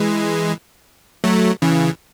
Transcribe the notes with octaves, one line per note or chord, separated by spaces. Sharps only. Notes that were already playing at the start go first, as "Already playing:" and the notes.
Already playing: E3 G#3
F#3 A3
C#3 E3